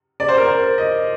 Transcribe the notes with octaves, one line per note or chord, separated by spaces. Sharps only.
D5
C5
A#4
C5
D#5